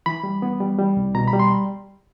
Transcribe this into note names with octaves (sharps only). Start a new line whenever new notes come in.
E3 B5
G3
B3
G3
G3
C2
B2 A#5
B5
G3
C6